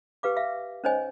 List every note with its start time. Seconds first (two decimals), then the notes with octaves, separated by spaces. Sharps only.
0.23 G4 B4 F5 D6
0.37 E5 F5
0.84 C#4 D#4 C5 C#5 D#5 G#5